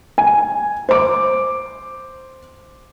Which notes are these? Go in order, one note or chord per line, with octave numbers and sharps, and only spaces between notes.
G#5
C5 D6